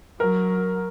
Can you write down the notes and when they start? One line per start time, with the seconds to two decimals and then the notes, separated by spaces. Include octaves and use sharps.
0.19 F#3 A#4